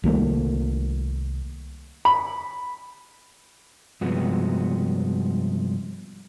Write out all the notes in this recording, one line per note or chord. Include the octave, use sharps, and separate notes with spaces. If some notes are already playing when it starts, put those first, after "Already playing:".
C2 D#3 A3 A#3
B5
G2 C3 F3 G#3 B3 F#4